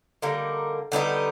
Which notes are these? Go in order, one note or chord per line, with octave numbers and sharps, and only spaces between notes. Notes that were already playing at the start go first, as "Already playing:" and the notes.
D3 G3 A#3 D#4
D3 G3 B3 D#4